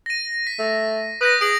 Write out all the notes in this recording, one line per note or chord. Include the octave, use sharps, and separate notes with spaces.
A#6 D#7
B6
A3
B4 D#6 G6 A#6
G#4 D7 F#7